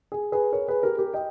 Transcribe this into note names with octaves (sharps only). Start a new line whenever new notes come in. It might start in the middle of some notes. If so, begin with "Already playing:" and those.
G#4
G#4 B4
A#4 C#5
G#4 B4
G4 A#4
G4 A#4
D#5 G5